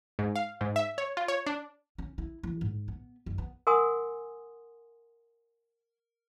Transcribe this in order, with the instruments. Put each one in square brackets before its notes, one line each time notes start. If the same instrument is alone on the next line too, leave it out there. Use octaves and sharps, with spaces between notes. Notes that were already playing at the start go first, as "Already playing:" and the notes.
[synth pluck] G#2
F5
G#2
E5
C#5
F4
C#5
D4
[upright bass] C#4
E4
E3
G#2
B3
F#1
B3
[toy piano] A#4 F#5 G#5 C6 D#6